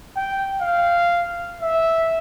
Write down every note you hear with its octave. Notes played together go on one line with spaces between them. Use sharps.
G5
F5
E5